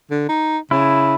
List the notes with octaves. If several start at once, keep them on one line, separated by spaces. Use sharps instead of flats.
D3
D#4
C#3 E4